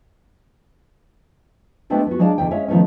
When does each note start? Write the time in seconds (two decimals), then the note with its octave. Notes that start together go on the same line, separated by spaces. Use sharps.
1.90 G#3 A3 B3 C4 D4 F#4
2.07 B3 F#4
2.19 F#3 G#3 D4 D5 F5 A5
2.38 E2 B2 D3 G5
2.51 G#3 C#4 C#5 E5 F5
2.68 D#3 F3 F#3 A3 B3 C#4